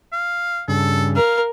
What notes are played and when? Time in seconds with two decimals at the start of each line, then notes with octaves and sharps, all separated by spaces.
0.13 F5
0.68 G2 C#3 A4
1.16 A#4 F5